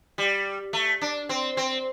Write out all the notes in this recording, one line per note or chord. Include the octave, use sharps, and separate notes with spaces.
G3
A3
D4
C4
C4